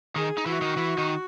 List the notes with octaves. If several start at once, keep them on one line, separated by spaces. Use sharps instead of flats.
D#3 D#4 G#4
D#4
E3 E4 F#4
D#3 D#4
E3 E4
D#3 D#4